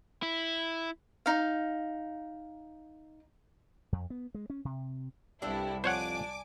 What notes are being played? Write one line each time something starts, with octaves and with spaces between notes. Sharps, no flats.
E4
D#4 F5
F2
B3
G#3
C#4
C3
C2 G2 D4 E4 G4 A4
F2 D4 C5 C#5 F#5 G#5 D6